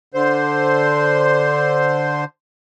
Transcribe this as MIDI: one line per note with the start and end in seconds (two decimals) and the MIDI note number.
0.14 2.24 50
0.14 2.24 72